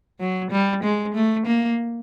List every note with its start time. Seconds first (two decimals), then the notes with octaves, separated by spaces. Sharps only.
0.20 F#3
0.51 G3
0.84 G#3
1.15 A3
1.47 A#3